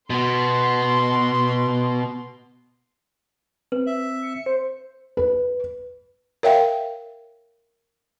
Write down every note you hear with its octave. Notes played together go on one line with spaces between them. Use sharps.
B2 B3 C6
C4 B4
E5
C#7
C5
B4
A#4 C#5 E5 F5 G5